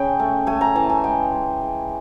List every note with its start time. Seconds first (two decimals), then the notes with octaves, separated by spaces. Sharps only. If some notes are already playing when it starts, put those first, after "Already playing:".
Already playing: C#3 G5
0.19 A3
0.47 A3 G#5
0.61 A#5
0.76 E3 A5
0.90 G#5
1.04 G#3 G5
1.32 G#3
1.61 G#3